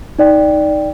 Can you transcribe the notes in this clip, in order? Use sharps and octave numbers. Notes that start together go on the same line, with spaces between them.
D#4 D5 G5